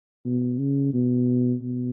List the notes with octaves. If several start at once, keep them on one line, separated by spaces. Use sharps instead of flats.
B2
C#3
B2
B2